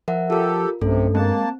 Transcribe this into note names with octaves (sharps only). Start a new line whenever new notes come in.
F3 A#4 E5 F#5
F4 G4 A4 A#4
B1 G2 C3 A3 C#4 A4
G#3 A#3 C4 A5